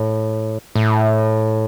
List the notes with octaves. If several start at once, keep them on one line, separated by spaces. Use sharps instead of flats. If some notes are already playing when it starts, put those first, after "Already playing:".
Already playing: A2
A2